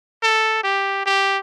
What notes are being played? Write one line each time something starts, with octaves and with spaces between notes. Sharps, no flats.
A4
G4
G4